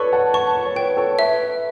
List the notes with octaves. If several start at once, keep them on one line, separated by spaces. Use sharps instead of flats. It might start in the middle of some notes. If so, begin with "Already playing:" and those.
Already playing: A4 B4 C#5 D5 C#6
F#5 A5
F#5 A5 C#6
C#5
B4 G5
A4 C#5
B4 E5